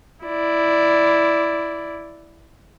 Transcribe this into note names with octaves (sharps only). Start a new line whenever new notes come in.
E4 D5